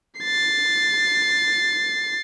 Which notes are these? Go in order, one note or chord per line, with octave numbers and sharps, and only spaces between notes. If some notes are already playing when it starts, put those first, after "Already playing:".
A6 C7